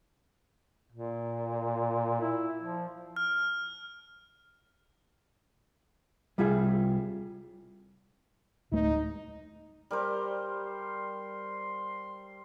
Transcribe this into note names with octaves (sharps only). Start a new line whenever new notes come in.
A#2
E4
F3
F6
C2 G3 F4 G#4 E5
D1 A3 D#4
G3 A#4 C5
C6